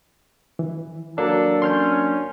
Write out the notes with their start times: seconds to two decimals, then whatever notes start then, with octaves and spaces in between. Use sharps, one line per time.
0.59 E3
1.18 F#3 A#3 D4 A4
1.62 C#4 C6 F6 G6